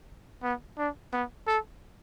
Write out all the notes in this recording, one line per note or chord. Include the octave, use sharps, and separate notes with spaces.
B3
D4
B3
A4